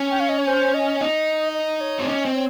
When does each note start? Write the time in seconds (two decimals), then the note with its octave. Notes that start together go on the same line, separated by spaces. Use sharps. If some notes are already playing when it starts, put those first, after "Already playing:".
Already playing: C#4
0.11 G5
0.20 F5
0.29 D#5
0.38 C#5
0.47 C5
0.74 D#5
1.01 D#4 D#5
1.54 D#5
1.81 C#5
1.99 C4
2.08 C#4 D#5
2.25 C4
2.34 C#5